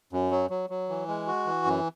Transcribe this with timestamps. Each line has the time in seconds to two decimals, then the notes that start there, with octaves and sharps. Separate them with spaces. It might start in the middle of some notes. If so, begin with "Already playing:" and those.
0.13 F#2
0.31 F#3
0.50 F#3
0.70 F#3
0.89 E3
1.08 G#3
1.27 F#4
1.46 E3
1.65 F#2